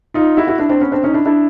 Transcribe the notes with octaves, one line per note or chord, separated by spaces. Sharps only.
D#4 F4
E4 F#4
E4 F#4
D4 E4
C4 D4
B3 C#4
C4 D4
C#4 D#4
D4 E4
D4 E4